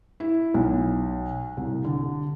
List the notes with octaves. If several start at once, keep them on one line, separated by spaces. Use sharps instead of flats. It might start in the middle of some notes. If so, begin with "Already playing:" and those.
E4
B1
C2
D3